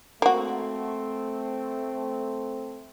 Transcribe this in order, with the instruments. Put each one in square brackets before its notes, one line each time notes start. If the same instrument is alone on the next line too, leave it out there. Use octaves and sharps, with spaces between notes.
[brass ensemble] A3 C4 A4 [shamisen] A#3 F#4